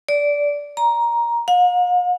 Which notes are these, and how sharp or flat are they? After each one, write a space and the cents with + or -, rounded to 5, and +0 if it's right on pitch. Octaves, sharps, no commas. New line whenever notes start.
D5 -15
A#5 +10
F5 +45